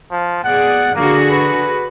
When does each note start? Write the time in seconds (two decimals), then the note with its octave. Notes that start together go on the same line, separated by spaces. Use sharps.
0.11 F3
0.44 B2 G#4 D5 F#5
0.95 D3 A#3 F#4 G#4
1.31 B4